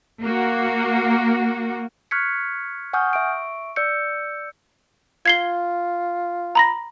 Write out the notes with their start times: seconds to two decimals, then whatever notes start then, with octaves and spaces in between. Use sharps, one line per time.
0.23 A#3 F#4
2.11 C#6 F6 F#6 G#6 B6 C#7
2.93 F#5 G#5 C#6 D#6 F6 G6
3.13 E5 C#6 D7
3.76 D5 E6 G6 C#7
5.26 F4 G#6 C7 G7
6.55 A#5 B5 A#6